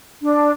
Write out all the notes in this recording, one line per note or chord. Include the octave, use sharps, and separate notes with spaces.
D4